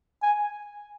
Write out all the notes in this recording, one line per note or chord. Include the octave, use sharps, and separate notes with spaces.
G#5